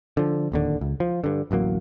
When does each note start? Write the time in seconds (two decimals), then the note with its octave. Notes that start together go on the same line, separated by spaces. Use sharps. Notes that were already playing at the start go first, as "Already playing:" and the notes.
0.17 D3 F3
0.52 D1 D#2 D3
0.81 C#2
1.00 F3
1.24 G2 D3
1.51 D1 A1 F#3 A#3